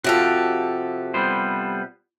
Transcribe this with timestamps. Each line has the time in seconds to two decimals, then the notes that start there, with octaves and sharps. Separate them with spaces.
0.04 C3 F3 F#4 G4 A4 F5
1.14 G3 B3 C5